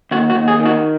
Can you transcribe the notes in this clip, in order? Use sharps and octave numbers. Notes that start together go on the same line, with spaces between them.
D#2 F#4
F#4
D#2
G#4
D#3
F#4